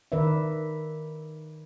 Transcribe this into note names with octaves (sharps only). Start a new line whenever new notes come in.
D#3 A#4 B4 D5 E5